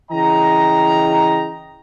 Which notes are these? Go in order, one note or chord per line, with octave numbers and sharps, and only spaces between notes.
C#3 E3 D#5 G5 A#5